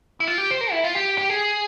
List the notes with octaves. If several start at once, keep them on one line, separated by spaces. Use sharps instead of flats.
E4
F4
G4
C5
A#4
E4
F4
G4
G4
G#4